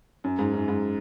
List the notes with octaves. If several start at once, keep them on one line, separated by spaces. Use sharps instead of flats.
F#2
G#2
F#2
G#2